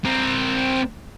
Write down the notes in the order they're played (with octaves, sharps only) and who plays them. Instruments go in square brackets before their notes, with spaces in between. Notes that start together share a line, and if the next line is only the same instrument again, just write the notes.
[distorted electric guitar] C4 A#4